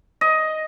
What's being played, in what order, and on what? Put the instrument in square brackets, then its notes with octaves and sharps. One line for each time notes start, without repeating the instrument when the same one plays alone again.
[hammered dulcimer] D#5